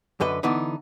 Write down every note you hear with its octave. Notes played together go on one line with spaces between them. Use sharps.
F#2 D3 B4 D#5
D3 E3 B3 D#4